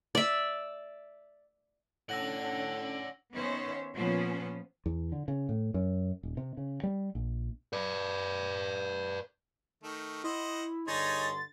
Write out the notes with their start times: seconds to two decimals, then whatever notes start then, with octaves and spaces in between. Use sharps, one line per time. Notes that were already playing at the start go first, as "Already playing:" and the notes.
0.15 D5 E5
2.09 A2 C#4 D4 D5 F#5 E6 A#6 F#7
3.34 D#3 B3 C#4 C5 C#5 E5
3.94 A#2 F3 B3 C#4 C5
4.86 E2
5.12 D3
5.28 C#3
5.49 A2
5.74 F#2
6.23 D#1
6.37 C3
6.57 C#3
6.83 G3
7.15 A#1
7.73 B4 D5
9.83 D#3 A3
10.24 E4 C5 D#5 F#5
10.88 G2 D3 D#4 G#4 C#5 C6 A6